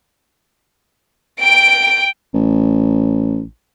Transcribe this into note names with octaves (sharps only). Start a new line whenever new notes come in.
G5 D7
A1